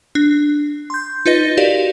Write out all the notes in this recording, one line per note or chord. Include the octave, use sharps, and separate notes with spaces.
D4
C6 G6
D#4 F4 B4 D#5 A#6
F#4 G4 A#4 D5 F5